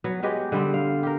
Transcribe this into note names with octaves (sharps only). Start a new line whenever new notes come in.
F#3 B3
F#3 G#3 G4 B4
D3 G3 B3 C4
F5
G4 A#4